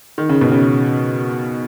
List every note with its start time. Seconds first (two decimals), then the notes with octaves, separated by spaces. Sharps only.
0.18 D#3
0.29 C#3
0.41 B2
0.52 C#3